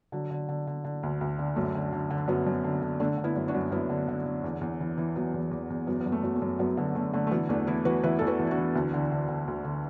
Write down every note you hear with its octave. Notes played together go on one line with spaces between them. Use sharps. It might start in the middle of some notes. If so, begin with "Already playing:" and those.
D3 F#3
D3
D3
D3
D3
D2
D2
D3
F#2 A3
D3
D3
D3
D4
F#2 F#3 B3
F#2
D3
D3
D3 A3 D4
D3
B3 E4
F#2
D4 F#4
F#2
F#2 B3 E4
D3
D3
D3
E2
E2
E3
E3
E3 F#3 B3
E2
E2
E2
F#2 F#3 B3
B3
F#2
A3
F#2 F#3
A3
F#2
F#2 F#3 B3
D3 F#3 B3
D3 A3
D3 A3
A3
E3 F#3 B3
E2 A3 D4
E3 B3 E4
E3 F#4 B4
E3 B4 E5
E2 A4
F#4 B4
E2
E4
D4 F#4
E3
D2
D3
D3
D3
D2
D3